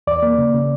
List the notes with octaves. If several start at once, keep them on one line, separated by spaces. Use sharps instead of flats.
E2 D5
A#3
C#3
C#3